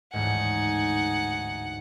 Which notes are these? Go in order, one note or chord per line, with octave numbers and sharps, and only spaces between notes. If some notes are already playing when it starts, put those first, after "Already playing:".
A1 D2 G#2 D#4 F#5 G#5